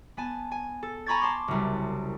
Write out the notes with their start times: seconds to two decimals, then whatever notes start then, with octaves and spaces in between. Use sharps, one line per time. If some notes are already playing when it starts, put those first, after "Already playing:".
0.17 B3 G#5 A5
0.51 G#5
0.83 A4
1.06 G#5 A#5 B5 C#6 G#6 A6
1.21 A5 C6 D6
1.48 F#1 C2